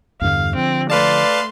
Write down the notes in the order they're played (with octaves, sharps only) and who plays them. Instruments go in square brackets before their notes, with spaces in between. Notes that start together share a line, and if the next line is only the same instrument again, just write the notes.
[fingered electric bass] E2 G2 D3 [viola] F5
[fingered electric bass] D3 F3 [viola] C4
[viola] A3 C6 [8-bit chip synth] B4 F5 A5 [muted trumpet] D5